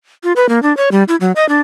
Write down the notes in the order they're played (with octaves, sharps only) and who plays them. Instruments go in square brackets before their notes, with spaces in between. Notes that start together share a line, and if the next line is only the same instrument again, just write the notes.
[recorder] F4
B4
A#3
D4
C#5
G3
E4
F#3
D#5
D4